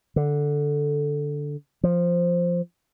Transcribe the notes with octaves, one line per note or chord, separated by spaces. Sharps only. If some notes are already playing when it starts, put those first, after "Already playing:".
D3
F3